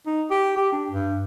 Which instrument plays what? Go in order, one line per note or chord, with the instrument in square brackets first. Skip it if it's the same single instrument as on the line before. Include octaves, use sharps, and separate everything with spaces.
[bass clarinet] D#4
G4
G4
D4
G2